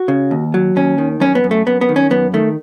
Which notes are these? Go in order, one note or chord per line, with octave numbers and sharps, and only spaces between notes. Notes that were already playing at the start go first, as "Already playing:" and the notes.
Already playing: F#4
C#3
D#2
F#3
D#2 C#4
D#3
F#2 C#4
B3
F#2
A3
F#2 B3
B3
D#3
C#4
F#2 B3
D#3 A3